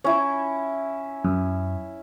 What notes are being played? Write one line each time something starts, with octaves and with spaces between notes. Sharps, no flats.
C#4 E4
F#2